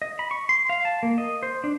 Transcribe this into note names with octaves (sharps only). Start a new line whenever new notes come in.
D#5
B5
C#6
C6
F5
A5
A#3
D#5
C5
D4